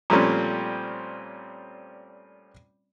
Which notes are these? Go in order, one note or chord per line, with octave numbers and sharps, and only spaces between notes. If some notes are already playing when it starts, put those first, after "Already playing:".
A#2 F3 G3 A3 C4 C#4